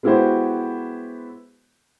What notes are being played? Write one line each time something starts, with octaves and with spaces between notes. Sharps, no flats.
G#3 B3 E4 F#4 G4 C5